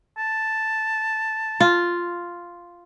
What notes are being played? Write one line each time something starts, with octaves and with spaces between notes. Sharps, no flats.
A5
F4